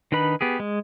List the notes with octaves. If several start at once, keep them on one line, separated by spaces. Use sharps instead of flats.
D#3 D4 D#4 B4 B5
B3 G4 G#4
G#3